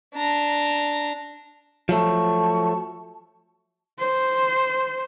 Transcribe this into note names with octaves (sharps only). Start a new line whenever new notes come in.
D4 A#5
F3 F#3 A3 A5 C#6
C5